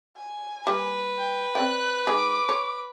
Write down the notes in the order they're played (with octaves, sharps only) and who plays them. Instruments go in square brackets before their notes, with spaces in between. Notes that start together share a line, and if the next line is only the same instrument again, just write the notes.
[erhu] G#5
[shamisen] G3 A#3 [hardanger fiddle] B4
[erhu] G5
[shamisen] C4 D5 G5 [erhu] F#6
[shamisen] D#3 G#3 G#4 [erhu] D6
[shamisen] C#5